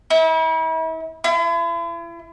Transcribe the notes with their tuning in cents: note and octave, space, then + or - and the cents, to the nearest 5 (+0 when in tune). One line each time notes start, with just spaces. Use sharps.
E4 -40
E4 +40